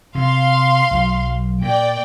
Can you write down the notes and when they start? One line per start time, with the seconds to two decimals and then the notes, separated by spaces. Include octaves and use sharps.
0.15 C3 F5 C6
0.91 B1 F#3
1.62 A#2 D5 G5